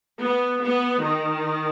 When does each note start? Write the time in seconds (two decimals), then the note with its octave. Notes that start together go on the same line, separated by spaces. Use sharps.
0.21 B3
0.62 B3
1.03 D#3